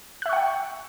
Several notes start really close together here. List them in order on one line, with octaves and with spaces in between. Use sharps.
F#6 E5 C#6 F#5 G5